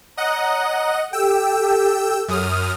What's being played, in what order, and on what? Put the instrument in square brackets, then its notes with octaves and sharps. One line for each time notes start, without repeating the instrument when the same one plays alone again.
[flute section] C#5 A#5 [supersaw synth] D#5 F#5
[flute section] G4 A4 [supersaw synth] G5 E6
[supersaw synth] F#2 D#6 F6